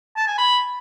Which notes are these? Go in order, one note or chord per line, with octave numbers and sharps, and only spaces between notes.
A5
G#5
B5